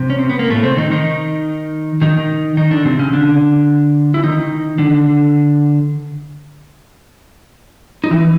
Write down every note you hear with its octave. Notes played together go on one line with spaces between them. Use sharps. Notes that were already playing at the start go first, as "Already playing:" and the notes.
Already playing: C3
C#4
C4
B3
A#3
A2 A3
C3 C4
D#3 D#4
D#3 D#4
D#3 D#4
D#3 D#4
D3 D4
C3 C4
C#3 C#4
D3 D4
E4
D#3 D#4
D3 D4
D#4
E3 E4